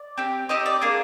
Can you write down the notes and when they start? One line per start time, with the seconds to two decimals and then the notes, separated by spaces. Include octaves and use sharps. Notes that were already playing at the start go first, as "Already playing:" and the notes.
Already playing: D5
0.18 C4 G4
0.49 C4 D#4 G4 D#5
0.66 D5
0.82 A#3 D4 G#4